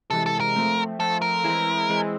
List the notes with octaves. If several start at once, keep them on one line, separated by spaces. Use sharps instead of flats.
C3 E3 G#3 A4
A4
A#4
F3 A3 C4
F3 A3 C4 A4
A#4
E3 G#3 C4 E4
E3 G#3 C4 E4